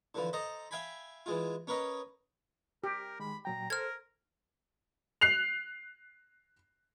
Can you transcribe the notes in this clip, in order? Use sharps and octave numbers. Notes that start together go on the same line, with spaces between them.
D3 E3 F3
A4 C5 D#5 A#5
E5 F5 G5 G#5 B5
E3 G#3 F4
C#4 A#4 B4 C#5 D#5
G4 A#4
D#3 G#3 B5
A#2 F#3 G5 A#5
A4 A#4 C5 F6 G#6
F#6 C7 F7